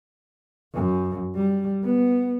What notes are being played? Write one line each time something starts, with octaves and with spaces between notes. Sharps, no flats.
F#2
G3
B3